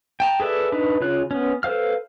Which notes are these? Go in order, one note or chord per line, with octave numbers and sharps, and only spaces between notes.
G5 A5 A#5
G#4 A4 B4 D5 E5
D4 D#4 B4
C#3 F4 C#5 F#6
B3 C#4
A4 B4 C5 F5 F6